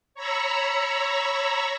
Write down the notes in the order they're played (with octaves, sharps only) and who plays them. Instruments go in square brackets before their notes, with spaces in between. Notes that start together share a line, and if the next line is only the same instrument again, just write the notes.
[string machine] C#5 A#5 B5 C#6 E6